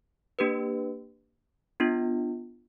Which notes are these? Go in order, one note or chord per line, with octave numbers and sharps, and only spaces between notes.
A#3 D4 G4 B4
B3 D4 F4